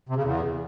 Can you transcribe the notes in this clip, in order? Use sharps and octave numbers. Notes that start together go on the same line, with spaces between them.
C3
C#3
E2